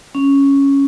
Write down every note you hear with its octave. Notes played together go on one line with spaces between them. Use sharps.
C#4